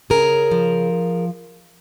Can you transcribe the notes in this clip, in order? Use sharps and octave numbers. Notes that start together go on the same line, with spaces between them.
C#3 G#4 A#4
F3